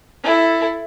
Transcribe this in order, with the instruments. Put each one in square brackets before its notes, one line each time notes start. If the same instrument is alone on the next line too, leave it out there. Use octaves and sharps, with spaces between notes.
[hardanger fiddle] E4 A4